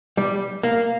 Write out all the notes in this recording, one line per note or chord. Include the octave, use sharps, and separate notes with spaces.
G3
A#3